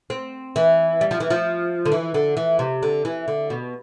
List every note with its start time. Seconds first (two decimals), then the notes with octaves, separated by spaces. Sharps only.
0.10 C4
0.56 E3
1.01 G3
1.11 F3
1.20 E3
1.30 F3
1.85 D3
1.92 E3
2.14 D3
2.37 E3
2.59 C3
2.83 D3
3.05 E3
3.28 D3
3.50 B2